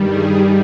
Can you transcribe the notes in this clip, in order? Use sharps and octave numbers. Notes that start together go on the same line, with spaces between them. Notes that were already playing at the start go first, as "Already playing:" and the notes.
Already playing: G2 D#3 G3
G#4